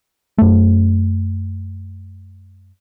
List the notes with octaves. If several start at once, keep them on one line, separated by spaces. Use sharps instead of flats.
F#2 A3